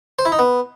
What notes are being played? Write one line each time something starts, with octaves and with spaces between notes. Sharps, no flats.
C5
E4
D#4
B3